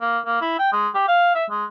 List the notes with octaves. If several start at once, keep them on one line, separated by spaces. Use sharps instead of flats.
A#3
A#3
E4
G5
G#3
G4
F5
E5
G#3